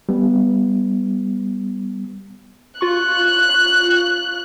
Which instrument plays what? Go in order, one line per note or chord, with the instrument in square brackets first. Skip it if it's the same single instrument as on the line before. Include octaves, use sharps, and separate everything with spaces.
[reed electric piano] G3 B3
[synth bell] F4 C#6 [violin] F#6